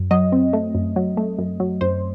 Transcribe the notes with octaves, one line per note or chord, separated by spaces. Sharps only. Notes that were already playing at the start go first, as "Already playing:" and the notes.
Already playing: F#2
F#3 D#5
C4
A3
F#2
F#3
A3
F#2
F#3
F#2 C5